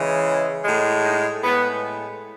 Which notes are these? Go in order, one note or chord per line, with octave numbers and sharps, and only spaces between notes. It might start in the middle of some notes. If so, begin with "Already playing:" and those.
Already playing: C#3 E3 G#3
A2 G#3
D#4
A2 G#3 B3